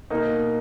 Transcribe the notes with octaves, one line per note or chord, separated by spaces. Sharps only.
B2 A#3 D#4